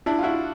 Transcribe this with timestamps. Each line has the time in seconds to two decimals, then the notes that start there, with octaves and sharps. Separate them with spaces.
0.06 D4 E4
0.19 F4
0.23 E4 F#4